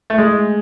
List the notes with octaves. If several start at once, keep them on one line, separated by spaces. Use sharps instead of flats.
A3
G#3